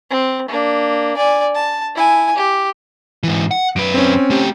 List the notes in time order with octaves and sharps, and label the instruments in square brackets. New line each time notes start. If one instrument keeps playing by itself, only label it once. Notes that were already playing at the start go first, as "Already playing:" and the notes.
[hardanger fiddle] C4
A#3 D4
D5 G#5
A5
E4 G#5
G4
[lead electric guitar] G#2 E3
F#5
[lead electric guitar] F#2 B4 [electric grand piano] D7
[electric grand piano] C4 C#4
[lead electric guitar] A3 G4